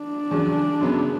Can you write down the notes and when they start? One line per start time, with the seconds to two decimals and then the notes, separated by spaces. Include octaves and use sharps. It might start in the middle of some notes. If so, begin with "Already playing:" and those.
Already playing: D4
0.31 E2 C#3 F#3
0.81 F#2 C#3 F#3 B3